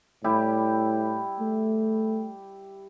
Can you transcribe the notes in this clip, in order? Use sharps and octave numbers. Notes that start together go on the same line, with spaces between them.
A2 G3 E4 G4
A3